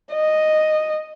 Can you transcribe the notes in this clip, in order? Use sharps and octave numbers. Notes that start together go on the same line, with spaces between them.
D#5